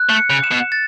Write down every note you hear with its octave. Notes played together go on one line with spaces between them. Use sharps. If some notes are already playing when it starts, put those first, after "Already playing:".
Already playing: F#6
A3
C#7
C#3
E7
B2
A6